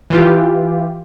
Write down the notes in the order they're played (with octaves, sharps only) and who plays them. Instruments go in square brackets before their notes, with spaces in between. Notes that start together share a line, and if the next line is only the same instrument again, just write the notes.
[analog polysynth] E3 F4 G4